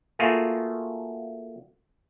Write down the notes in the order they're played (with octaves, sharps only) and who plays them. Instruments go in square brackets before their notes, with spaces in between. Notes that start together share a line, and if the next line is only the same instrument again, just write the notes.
[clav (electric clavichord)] A3 A#3 F4 F#4 G#4